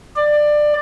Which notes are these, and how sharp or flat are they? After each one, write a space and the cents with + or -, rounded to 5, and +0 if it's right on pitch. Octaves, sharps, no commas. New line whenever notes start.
D5 +20